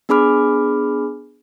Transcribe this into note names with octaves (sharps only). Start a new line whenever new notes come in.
B3 D4 G#4 B5 D6 F6